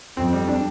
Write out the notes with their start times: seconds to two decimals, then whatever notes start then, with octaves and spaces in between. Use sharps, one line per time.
0.17 F2 C4
0.33 G3
0.48 D4